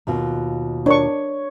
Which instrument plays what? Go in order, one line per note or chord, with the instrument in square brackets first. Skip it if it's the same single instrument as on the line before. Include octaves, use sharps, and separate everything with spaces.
[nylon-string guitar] D#2 B2 F4
[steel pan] D4 A#4 C#6 [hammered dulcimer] C#5